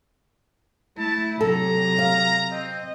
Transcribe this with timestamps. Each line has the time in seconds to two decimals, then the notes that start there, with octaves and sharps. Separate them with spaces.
0.98 A3 E4 A5
1.41 C3 F#3 A4 A#5
1.99 F5
2.52 C4 D#5